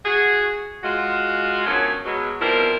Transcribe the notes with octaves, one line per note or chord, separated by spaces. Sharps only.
F#4 G#4
G#3 F4 F#4
D3 D#3 F3 F#3 B3 C#4
B2 F#3 G#3
B2 F3 G3 C4 E4 A#4